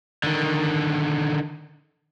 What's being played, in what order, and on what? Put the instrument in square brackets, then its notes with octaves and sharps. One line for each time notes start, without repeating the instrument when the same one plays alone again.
[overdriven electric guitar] D3 D#3